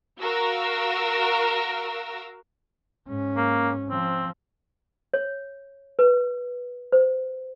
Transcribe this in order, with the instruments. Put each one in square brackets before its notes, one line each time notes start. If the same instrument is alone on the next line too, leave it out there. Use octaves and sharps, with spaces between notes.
[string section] F#4 A#4 F5 E6 A#6
[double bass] G#2 C#4
[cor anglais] A#3
[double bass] F3 [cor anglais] C4
[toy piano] C#5
B4
C5